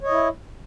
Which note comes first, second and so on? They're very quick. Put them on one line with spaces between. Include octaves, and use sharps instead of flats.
C#5 D#5 E4